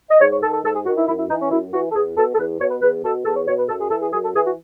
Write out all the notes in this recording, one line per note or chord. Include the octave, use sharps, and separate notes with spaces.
D#5
G#2 C#5
C#5
D#3 A4
A4
G#2 A4
G#4
D#3 F#4
E4
F#2 E4
E4
E3 D#4
C#4
F#2 E4
E3 F#4
A4
E2 G#4
B2 A4
A4
E2 B4
B2 C#5
B4
E2 B4
B2 A4
E2 A4
C#5
B2 C#5
B4
F#2 A4
G#4
E3 A4
G#4
F#2 G#4
A4
E3 G#4
F#4